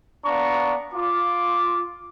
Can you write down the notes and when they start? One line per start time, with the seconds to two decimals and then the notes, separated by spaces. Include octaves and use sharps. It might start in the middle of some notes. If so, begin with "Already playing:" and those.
0.25 B3 D4 D5 F5 A#5 C#6
0.94 F4 D6